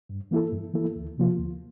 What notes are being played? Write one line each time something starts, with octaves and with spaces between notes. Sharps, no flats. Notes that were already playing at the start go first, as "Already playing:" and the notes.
G2
E3 A#3 E4 A4
G2
E3 A#3 E4 A4
D2
C3 F3 A#3 F4
D2